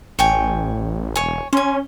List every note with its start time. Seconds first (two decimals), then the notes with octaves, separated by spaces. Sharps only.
0.19 A1 C#5 G5 G#5
1.16 E1 C#5 G#5
1.53 C#4 G#5 C6